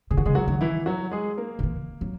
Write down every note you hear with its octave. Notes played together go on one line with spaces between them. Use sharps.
C#3 G#4
D#3 F#4
C#3 G#3 G#4
F#3 F#4
D#3
E3 E4
F#3 F#4
G#3 G#4
A#3 A#4
D#3
E3
F#3